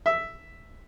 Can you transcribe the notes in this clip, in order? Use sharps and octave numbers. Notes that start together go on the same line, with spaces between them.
E5